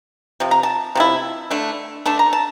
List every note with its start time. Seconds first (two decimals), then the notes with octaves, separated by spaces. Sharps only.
0.40 C3 F3
0.51 A#5
0.63 A5
0.95 C3 F3 E4
1.50 D3 A3 D4
2.06 D3 A3 D4 A5
2.19 A#5
2.33 A5